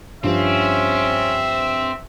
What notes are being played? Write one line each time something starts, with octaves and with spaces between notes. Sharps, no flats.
G2 F3 C4 C#4 E5